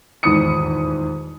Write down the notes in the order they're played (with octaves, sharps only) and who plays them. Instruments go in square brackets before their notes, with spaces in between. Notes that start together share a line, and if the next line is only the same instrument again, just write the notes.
[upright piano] D#1 E2 G#2 B5 D#6 C#7